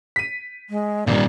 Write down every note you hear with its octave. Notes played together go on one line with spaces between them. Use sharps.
B6 D#7
G#3
G#1 A#2 G3 D5